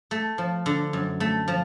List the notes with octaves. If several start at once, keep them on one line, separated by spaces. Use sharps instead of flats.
A3
F3
D3
F#2
A3
F3